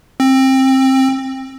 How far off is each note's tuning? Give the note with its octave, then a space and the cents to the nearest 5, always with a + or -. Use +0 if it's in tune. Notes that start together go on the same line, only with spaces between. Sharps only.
C4 +20